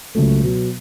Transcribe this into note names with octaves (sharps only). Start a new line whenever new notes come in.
C#2 C#3 F#3 A3
B2 F#3 B3